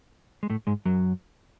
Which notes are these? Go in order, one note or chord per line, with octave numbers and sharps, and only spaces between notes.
G#3
A2 A3
G#2 G#3
F#2 F#3